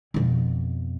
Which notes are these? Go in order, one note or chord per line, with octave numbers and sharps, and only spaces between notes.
F2 B2